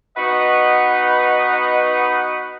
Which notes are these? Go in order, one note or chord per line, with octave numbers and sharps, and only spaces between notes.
B3 D#4 F#4 B4 D#5 F#5